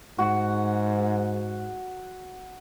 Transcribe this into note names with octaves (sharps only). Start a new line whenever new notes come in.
G#2 F#4